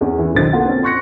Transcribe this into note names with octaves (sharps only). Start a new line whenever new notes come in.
E2 C#4
E3
B1 D3 D#3 C5 A6
A#3 B3 F4 A4 F#5
C4 C#4
C6 C#6 F#6 A#6 C#7